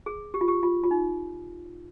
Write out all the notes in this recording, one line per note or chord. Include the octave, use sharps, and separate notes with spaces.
G#4
G4
F4
G4
F4
F4
D#4